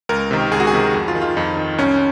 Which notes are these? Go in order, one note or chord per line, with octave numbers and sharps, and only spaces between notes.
C#2 A#4
C3 D#3
C#2 G#4
F#4
G#4
C3 D#3
F2
F4
D#3
F4
F2 D#4
D#3
C2 C#4